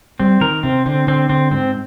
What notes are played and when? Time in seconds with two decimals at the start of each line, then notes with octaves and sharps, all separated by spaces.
0.20 G3 C4
0.41 D#3 A#4
0.63 C3 C4
0.86 D3 C4
1.07 D3 C4
1.29 D3 C4
1.51 G#2 C4